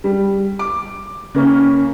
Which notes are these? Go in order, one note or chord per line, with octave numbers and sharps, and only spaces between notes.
G3
D6
C#3 A#3 C#4